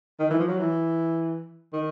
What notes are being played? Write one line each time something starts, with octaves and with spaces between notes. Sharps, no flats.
D#3
E3
F3
F#3
E3
D#3